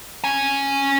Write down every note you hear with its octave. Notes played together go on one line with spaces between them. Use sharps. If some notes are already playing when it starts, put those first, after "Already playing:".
C#4 G#5